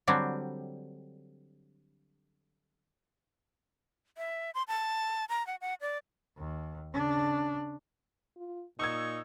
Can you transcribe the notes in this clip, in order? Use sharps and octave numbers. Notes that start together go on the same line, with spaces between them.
D3 F#3 G3 C4
E5
C6
A5
A#5
F#5
F#5
D5
D#2
C#3 D4
F4
A#2 D#4 C#6 D#6 E6 G#6